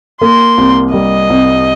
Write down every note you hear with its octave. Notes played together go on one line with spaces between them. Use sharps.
A#3 C6
C2
G3 D#5
C2